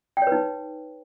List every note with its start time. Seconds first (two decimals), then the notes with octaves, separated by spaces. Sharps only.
0.17 G5
0.22 C#5
0.27 B4
0.32 D#4